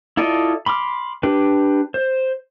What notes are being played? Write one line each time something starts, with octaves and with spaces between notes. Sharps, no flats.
E4 F4 A4 D5 D#5
B5 C6 D6 F6
D4 G4 B4
C5